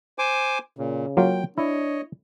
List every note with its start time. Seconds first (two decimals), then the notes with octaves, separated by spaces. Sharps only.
0.19 C5 G#5 D6
0.78 A#2 C#3
1.17 F#3 A#3 F4 G5
1.58 D4 E4 C#5 D#5